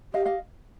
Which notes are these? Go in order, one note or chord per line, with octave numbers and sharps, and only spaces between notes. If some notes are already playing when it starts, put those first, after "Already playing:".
G4 D#5 F5
D#5 F5